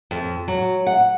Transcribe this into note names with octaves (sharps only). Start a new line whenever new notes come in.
F2
F#3
F#5